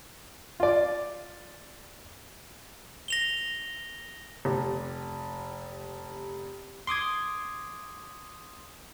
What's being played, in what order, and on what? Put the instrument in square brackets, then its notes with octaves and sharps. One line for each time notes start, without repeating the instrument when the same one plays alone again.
[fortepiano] F4 D5
[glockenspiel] A#6 F7 G7
[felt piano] F1 [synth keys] G4
[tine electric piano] C6 D6 D#6 G#6